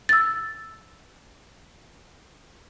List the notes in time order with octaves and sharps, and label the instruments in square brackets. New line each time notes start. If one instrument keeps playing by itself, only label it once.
[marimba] E6 A6